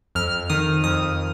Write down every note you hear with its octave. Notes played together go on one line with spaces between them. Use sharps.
F2 F6
D#3 D#6
F2 D#6